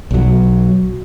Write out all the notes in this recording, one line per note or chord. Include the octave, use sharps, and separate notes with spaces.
B1 F#3